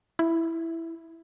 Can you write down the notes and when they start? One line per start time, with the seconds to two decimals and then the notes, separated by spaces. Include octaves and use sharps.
0.19 E4